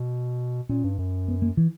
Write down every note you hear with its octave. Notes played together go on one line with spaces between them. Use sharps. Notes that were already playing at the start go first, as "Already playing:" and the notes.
Already playing: B2
A#2 C#4
G2
F#2
B3
A#3
E3